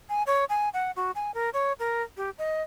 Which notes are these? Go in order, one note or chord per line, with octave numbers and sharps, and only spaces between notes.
G#5
C#5
G#5
F#5
F#4
G#5
A#4
C#5
A#4
G4
D#5